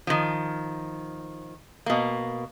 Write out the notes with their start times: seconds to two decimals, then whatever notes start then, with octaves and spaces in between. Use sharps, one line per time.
0.07 D#3 F3
1.86 B2 A#3